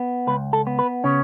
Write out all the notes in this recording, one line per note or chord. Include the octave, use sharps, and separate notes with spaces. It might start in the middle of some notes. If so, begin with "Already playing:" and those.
Already playing: B3
C#2 B4
A4
B3
B4
C#3 C#4